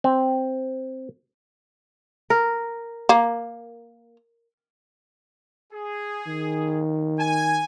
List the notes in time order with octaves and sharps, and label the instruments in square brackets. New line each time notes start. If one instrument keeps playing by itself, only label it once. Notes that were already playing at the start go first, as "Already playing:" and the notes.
[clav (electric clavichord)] C4
[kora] A#4
[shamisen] A#3
[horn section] G#4
[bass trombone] D#3
[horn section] G#5